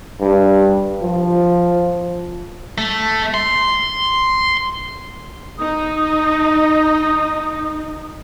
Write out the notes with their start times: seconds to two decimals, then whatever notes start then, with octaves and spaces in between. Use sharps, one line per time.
0.20 G2
1.02 F3
2.78 A3
3.34 C6
5.58 D#4 D#6